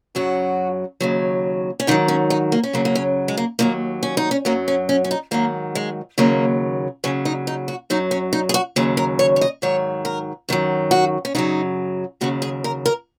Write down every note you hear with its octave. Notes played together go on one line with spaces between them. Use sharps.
F#2 C#3 F#3 F#4
D#2 C#3 F#3
C#4
G#2 D#3 F#3 D#4
C#4
D#4
A#3
C#4
F#2 C#3 F#3 A#3
A#3
C#4
G#3
A#3
D#2 D#3 F#3 A#3
C#4
D#4
C#4
F#2 F#3 A#3
C#4
C#4
C#4
D#4
G#2 D#3 F#3 A#3
G#3
D#2 C#3 F#3 A#3
D#2 C#3 F#3 C#4
D#4
D#4
F#4
F#2 F#3 D#4
C#4
D#4
G#4
F#4
D#2 C#3 F#3 G#4
A#4
C#5
C#5
D#5
G#2 D#3 F#3 C#5
A#4
F#2 D#3 F#3
F#4
C#4
F#2 C#3 F#3 D#4
D#2 C#3 F#3 F#4
G#4
A#4
A#4